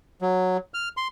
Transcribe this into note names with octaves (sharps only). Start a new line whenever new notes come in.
F#3
F6
C6